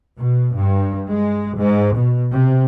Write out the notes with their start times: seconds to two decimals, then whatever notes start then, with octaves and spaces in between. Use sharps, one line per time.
0.18 B2
0.56 G2
1.09 G#3
1.58 G#2
1.95 B2
2.31 C3